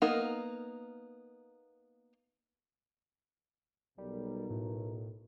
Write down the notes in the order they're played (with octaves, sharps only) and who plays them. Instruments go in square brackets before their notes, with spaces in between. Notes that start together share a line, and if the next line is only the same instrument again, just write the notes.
[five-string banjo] A#3 B3 D#4 A#4
[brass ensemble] B1 B2 A#4 [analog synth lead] G3
[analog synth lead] A2